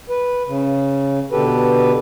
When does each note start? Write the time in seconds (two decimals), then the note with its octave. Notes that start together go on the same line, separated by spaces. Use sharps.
0.09 B4
0.48 C#3
1.32 B2 D3 G4 A4 B4